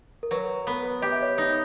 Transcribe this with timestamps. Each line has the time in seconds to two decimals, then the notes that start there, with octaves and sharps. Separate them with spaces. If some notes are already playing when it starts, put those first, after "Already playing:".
0.23 A#4
0.31 F#3 B4
0.67 B3
1.02 G4 D#5
1.12 E5
1.22 C#5 D#5
1.38 D#4